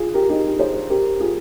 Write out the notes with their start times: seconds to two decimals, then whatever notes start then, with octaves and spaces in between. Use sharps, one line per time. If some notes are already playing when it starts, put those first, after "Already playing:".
Already playing: F4 G#4
0.14 G4 A#4
0.29 D#4 G4
0.59 G#4 C5
0.90 G4 A#4
1.20 F4 G#4